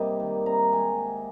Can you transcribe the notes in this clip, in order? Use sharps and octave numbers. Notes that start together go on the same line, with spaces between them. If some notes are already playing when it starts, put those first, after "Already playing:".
Already playing: G2 C3 G3 A#3 D#5
D#3
C3 A#5
G#3 G#5